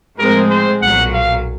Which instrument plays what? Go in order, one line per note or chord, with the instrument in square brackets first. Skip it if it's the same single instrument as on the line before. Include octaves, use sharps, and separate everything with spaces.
[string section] A2 F3 G#3 C4 [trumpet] A#4
[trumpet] C5
[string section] B1 A#2 F#3 [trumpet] F#5
[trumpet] F5